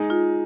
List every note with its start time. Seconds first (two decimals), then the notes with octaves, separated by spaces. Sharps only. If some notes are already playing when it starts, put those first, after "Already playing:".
Already playing: G#3 D#4 G#4
0.10 F4